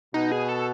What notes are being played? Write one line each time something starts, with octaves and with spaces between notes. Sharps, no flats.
B2 D#4
G#4
A4